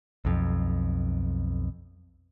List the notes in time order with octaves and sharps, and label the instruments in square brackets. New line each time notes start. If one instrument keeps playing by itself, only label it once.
[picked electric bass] B1 F2